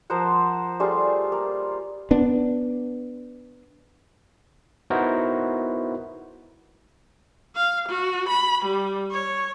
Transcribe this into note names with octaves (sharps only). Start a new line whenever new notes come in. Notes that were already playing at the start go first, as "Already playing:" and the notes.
F3 A#4 C5 F#5
G3 A3 F4 G#4
A#3
B3 D4
B3 D#4 E4 F#4 A#4 C5
F5
F#4
B5
G3
C#5